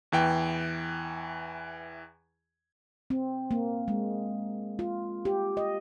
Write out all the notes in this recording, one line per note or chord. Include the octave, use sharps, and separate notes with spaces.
E2 E3 G5
C4
A#3
G#3
F4
G4
D#5